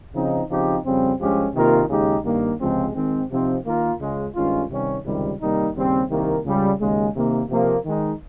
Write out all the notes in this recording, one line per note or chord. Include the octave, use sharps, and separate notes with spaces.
C#3 F3 C4 D#4
C#3 F3 C4 D#4 G4
F2 C#3 G3 C4
G2 F3 G#3 C#4 G4
C3 D#3 A#3 F4 A#4
D#2 C#3 G#3 D#4 G4
G2 D#3 A#3
C#2 C3 F3 G#3 C4
D#3 G#3 C4
C3 F3 C4 D#4
D#3 A#3 F4 A#4
C#2 C#3 G#3
G2 D#3 G#3 C#4 F4
C3 D#3 G3 C#4
C#2 C3 D#3 G3
C3 D#3 G3 A#3 D#4
D#2 C#3 G3 C4 G4
C2 C3 D#3 A#3
C#2 C#3 G3
D#2 C#3 G#3
C3 D#3 A#3
C3 F3 A#3
D#3 G#3 D#4